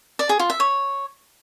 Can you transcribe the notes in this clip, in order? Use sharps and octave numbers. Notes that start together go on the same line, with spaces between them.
D5
G#4
F4
E5
C#5